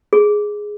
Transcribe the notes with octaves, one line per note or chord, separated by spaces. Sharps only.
G#4